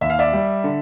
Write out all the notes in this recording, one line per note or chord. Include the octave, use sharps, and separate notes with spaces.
D#2 E5
F5
D5 E5
G3
D3